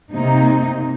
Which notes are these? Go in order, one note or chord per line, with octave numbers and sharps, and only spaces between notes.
C3 A#3 D#4